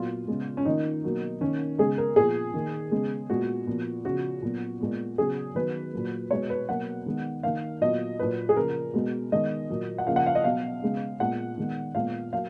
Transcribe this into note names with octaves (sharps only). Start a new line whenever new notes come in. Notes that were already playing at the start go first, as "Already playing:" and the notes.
Already playing: A#2 F#3 B3 F4
C#3 G#3 B3
C#4
D#3 A#3 D#4
B2 F#3 A#3
D#3 A#3 C#4
C#3 G#3 B3 G#4
A#4
A#2 F3 B3 G#4
D#3 A#3
C#3 G#3 B3
A#2 G#3 B3 F#4
A#2 F3 B3
C#3 F3 B3 F#4
A#2 F#3 B3
A#2 G#3 B3
C#3 F#3 B3 G#4
D#3 F#3 B3 B4
A#2 F#3 A#3
B2 G#3 B3 C#5
B4
B2 F#3 A#3 F#5
D#3 G#3 B3
D#3 A#3 F5
A#2 F#3 B3 D#5
A#2 F#3 A#3 B4
G#4
C#3 F3 A#3 A#4
B2 G#3 B3
D#3 G#3 B3 D#5
A#2 F#3 A#3
F#5
C#3 F3 A#3 F5
F#5
F5
D#5
B2 F#3 B3 F5
C#3 G#3 B3
A#2 G#3 B3 F#5
D#3 G#3 B3
A#2 G#3 B3 F5
F#3 A#3 F5